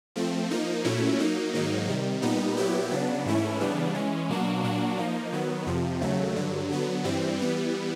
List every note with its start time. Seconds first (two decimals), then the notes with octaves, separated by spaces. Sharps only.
0.16 F3 A3 C4
0.51 F3 A#3 D#4
0.84 A#2 F#3 A3 C#4 E4
1.19 F#3 A#3 D#4
1.53 G#2 D#3 F#3 A#3 D#4
1.88 C3 D#3 G3
2.22 A#2 G3 B3 D#4
2.57 A#2 F#3 B3 E4 G4
2.91 C#3 F#3 B3 D4
3.26 G#2 E3 A3 C#4 E4
3.60 C#3 E3 G3 B3 D4
3.95 E3 G#3 C#4
4.29 B2 F#3 A#3 D4 F#4
4.63 A#2 F#3 A#3 D4 F#4
4.98 F3 A#3 D#4
5.32 D#3 F#3 B3
5.67 F2 C3 F3
6.01 D#2 C#3 F#3 A3
6.36 G2 D3 F#3
6.70 D3 F#3 B3
7.04 G2 E3 G3 C4
7.39 E3 G3 B3